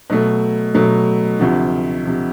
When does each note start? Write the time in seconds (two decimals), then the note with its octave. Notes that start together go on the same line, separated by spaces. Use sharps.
0.10 B2 F#3 A3
0.75 B2 F#3 A3
1.39 D2 C3 F3
2.05 C3 F3